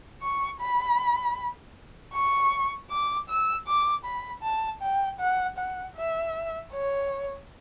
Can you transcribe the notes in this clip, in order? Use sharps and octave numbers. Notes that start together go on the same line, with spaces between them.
C#6
B5
C#6
D6
E6
D6
B5
A5
G5
F#5
F#5
E5
C#5